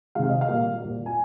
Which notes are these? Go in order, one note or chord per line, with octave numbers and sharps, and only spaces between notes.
C3 D#3 G#3 F5
D#5
F5
A#2 G3 A#3
A#2 G3 A#3
G#5